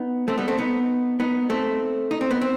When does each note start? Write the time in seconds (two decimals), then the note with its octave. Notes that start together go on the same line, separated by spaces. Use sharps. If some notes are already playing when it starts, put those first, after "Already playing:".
Already playing: B3 D#4
0.28 A3 C4
0.38 G3 B3
0.48 A3 C4
0.58 B3 D#4
1.20 B3 D#4
1.50 A3 C4
2.11 D#4
2.21 C4
2.31 B3
2.41 C4